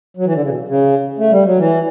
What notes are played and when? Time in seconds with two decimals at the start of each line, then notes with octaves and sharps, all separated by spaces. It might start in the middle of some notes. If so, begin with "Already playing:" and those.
0.17 F#3
0.25 E3
0.34 D3
0.42 C#3
0.50 B2
0.68 C#3
1.18 A3
1.31 G3
1.45 F#3
1.58 E3